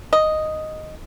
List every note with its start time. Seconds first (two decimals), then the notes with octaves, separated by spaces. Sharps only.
0.13 D#5